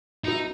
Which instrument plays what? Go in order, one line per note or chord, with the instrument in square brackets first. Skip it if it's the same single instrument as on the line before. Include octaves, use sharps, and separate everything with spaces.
[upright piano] B2 F#3 B3 E4 G4 [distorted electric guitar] D#4